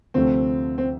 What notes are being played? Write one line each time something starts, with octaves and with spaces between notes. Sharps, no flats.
D2 C3 F3 A3 C4
C4